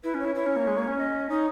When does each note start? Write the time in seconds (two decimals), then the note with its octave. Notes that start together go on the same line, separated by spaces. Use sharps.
0.04 E4 B4
0.14 C#4
0.20 C#5
0.25 E4
0.35 E4 C#5
0.46 C#4
0.56 A#3
0.67 G#3
0.77 A#3
0.88 C#4
0.99 D#5
1.29 D#4 C#5